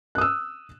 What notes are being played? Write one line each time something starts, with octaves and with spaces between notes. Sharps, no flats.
D#6 E6 F#6